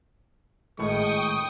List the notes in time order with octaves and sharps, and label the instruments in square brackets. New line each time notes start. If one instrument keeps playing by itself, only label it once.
[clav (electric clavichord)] G#1 A2 [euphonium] G#3 [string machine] G5 D#6 [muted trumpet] C#6